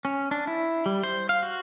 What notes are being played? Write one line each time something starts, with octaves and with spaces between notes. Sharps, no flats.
C#4
D4
E4
G3
C5
F5
F#4